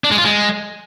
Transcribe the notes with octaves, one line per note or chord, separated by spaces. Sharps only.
D4
G#3
F4
G#3